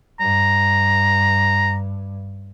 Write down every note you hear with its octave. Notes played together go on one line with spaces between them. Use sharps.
G2 A#5